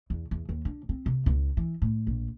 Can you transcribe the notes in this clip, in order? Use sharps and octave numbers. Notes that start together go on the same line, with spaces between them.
E2
E2
D#2
D3
C4
C3
C#2
E3
A2
A#1